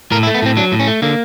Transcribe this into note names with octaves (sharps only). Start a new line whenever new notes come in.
A2 A#4
E4
A3
B3
A2 C4
F#3 D4
A2
C#4
A3
D3 A#3